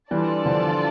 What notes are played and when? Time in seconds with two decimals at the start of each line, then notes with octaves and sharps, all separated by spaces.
0.11 E3 G3 D4 F4 A4 D5 A5
0.46 D3 F3